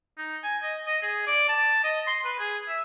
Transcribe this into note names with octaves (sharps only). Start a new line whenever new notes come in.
D#4
G#5
D#5
D#5
G#4
D5
A5
D#5
C6
B4
G#4
E5